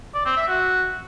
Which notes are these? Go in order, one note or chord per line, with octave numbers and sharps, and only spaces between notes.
D5
C4
E5
F#4